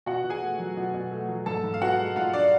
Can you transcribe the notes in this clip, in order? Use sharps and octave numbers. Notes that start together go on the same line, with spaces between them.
B2 F#4 F#5
B2
G#4 G#5
A3
F#3
B2
B2
A3
F#3
G#2 A4 A5
G#2
F5
B3 F#4 F#5
G#3
G#2 F4 F5
D4 D5